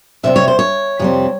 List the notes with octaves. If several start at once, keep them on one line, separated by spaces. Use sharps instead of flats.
F2 C3 G3 C4 E5
C#5
C5
C#5
F2 C3 G3 C4